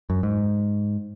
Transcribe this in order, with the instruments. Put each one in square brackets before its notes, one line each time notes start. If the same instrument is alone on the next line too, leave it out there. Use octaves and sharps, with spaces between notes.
[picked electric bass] F#2
G#2